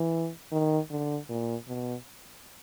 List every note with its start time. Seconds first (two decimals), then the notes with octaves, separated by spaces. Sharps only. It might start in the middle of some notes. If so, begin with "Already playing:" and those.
Already playing: E3
0.52 D#3
0.90 D3
1.29 A#2
1.68 B2